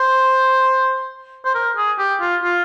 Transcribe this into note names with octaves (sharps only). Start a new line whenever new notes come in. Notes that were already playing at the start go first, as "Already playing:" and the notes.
Already playing: C5
C5
A#4
G#4
G4
F4
F4